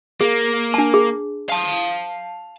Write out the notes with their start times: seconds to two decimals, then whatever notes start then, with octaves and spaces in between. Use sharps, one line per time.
0.21 A#3 G#4
0.74 D4 A5
0.94 G#4
1.49 F5 A5